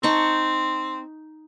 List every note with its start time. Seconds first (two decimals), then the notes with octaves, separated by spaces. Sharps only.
0.03 C4 D#4 A5 C#6